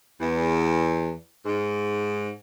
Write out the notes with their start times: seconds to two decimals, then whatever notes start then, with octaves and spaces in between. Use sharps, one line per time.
0.21 E2
1.46 G#2